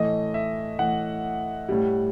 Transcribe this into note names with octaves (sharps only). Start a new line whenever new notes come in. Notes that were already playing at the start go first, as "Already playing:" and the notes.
Already playing: A2 E3 A3 D#5
E5
A2 E3 A3 F#5
A2 G3